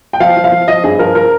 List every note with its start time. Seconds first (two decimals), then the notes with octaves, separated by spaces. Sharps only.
0.13 G5
0.20 F3 F5
0.37 F3
0.44 F5
0.52 F3
0.68 F3 D#5
0.84 G2 G#4
0.99 F3 A#4
1.15 F3 A#4